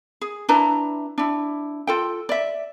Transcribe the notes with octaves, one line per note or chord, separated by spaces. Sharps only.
G#4
D4 E4 B4 A#5
D4 E4
F4 A4 G5
D5 E5